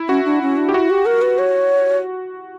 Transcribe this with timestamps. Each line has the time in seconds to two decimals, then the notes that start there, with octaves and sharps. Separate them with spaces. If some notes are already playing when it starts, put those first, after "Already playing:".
Already playing: E4
0.09 C#4 F#4
0.25 D4
0.42 C#4
0.57 D4
0.69 G4
0.74 E4 F#4
0.90 G4
1.06 A#4
1.22 B4
1.39 C#5